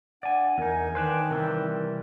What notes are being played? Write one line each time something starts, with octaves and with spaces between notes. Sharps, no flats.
D4 D5 F#5 G#5
E2 D#4 A#4 G#5
D#3 D4 B4 C5
C3 E3 G3 A#4